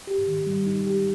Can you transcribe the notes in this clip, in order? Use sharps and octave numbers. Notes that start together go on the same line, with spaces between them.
G4
D#3
G3
D#4
G4